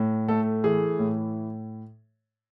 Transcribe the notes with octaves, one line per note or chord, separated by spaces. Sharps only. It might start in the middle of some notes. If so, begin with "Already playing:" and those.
Already playing: A2
A3 A4
E3 G#4
A2